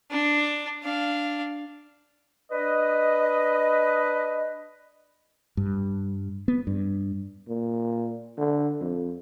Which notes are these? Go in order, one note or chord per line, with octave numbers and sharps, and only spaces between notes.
D4
D4 F5
D4 B4 D#5
G2
B3
G2
A#2
D3
F2